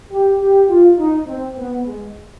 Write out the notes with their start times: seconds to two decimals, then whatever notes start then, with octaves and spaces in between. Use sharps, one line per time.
0.11 G4
0.40 G4
0.69 F4
0.98 D#4
1.26 C4
1.57 B3
1.85 G#3